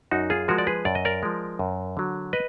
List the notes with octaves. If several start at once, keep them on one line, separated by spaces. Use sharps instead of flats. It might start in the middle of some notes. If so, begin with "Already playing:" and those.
F#2 D#4 F#4
F4 G#4
F3 G#3 F#4 A#4
D5
G#4 B4
F#2 D5
D#5
A#4 D5
F3 G#3
F#2
D3 F#3
B4 D#5